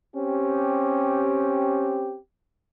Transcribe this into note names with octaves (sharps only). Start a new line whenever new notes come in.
C4 C#4 G4